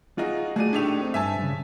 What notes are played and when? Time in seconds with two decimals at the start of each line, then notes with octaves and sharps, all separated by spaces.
0.18 D#4 F4 F#4 G#4
0.56 A3 F#4 G#4 D5 D#7
0.73 A2 A3 D4 D#4 G4 F7
1.01 C4
1.14 G2 E5 G#5 A5
1.38 G2 C#3